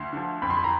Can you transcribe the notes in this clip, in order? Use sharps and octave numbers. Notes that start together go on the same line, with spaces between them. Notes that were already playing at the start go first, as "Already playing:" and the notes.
Already playing: D2 C6
D3 F3
F2 B5
C6
B5
A#5